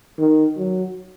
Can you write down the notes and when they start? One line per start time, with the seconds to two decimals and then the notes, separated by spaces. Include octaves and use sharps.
0.19 D#3
0.57 F#3